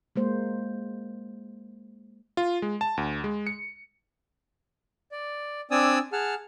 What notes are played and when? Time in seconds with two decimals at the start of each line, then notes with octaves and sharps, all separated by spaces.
0.16 G#3 A#3 C5
2.37 F4
2.62 G#3
2.81 A5
2.97 D2
3.24 G#3
3.47 C#7
5.12 D5
5.71 C4 D4 D5 G#5 D#6 E6
6.13 G#4 F#5 A5 F6